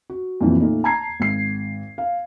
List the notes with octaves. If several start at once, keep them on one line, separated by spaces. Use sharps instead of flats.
F#4
F2 A#2 E3 F#3
A#2 A3 D#4
A5 A#5 G#6 C7
G#1 C7
F5